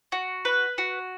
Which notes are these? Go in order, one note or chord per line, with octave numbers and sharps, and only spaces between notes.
F#4
B4
F#4